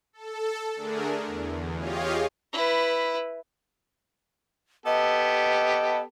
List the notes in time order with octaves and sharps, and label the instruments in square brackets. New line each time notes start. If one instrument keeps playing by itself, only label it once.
[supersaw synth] A4
D3 A3 D4 G#4 A#4
E2
F4 G4 G#4 C#5 D#5 F5
[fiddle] E4 B4
[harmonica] B3 G4 A4 [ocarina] D#5